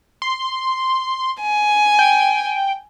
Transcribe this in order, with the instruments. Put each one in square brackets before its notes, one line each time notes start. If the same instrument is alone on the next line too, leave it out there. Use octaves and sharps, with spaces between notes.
[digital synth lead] C6
[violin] G#5
[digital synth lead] G5